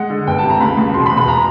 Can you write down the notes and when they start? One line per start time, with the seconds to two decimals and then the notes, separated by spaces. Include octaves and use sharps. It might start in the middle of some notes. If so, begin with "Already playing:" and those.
Already playing: G#3 F#5
0.10 D3
0.27 G1 G5
0.38 A5
0.43 C3
0.50 A#5
0.60 C#2 B5
0.77 C#2
0.94 E1 C6
1.06 B5
1.11 E1
1.17 B5
1.28 A#5